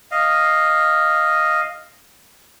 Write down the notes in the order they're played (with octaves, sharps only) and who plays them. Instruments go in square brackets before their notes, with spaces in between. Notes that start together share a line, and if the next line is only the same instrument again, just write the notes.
[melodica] D#5 F5